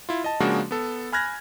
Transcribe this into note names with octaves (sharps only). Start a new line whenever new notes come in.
E4 F4
D#5 A5
C#3 F3 G#3 A#3 D4 F#4
B3 A4
G#5 B5 F6 F#6 G#6 A#6